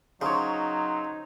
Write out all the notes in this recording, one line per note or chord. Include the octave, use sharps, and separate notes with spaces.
C#3 F#3 D#4 C5 C#5